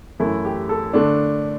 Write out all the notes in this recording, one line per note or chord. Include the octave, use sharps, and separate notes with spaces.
F#2 E3 A3 E4
G4
A4
D3 A3 D4